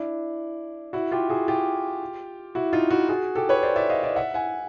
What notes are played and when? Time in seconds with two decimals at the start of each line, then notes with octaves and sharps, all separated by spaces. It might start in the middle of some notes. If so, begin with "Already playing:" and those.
Already playing: D4 E4
0.93 E4 F#4
1.12 F4 G4
1.29 F#4 G#4
1.48 F4 G4
2.55 E4 F#4
2.73 D#4 F4
2.91 E4 F#4
3.09 F#4 G#4
3.35 G4 A4
3.49 B4 C#5
3.63 C5 D5
3.76 D5 E5
3.89 D#5 F5
4.03 D5 E5
4.16 E5 F#5
4.34 F#5 G#5